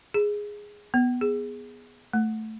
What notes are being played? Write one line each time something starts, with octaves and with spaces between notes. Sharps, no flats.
G#4
B3
G#4
A3